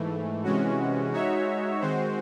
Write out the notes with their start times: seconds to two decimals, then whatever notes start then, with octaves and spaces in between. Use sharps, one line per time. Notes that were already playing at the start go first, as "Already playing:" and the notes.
Already playing: G#2 E3 A3
0.43 C3 E3 G#3 C#4 F#4
1.12 G#3 D#4 F#4 C#5 E5
1.80 D#3 G#3 C4 F#4 C5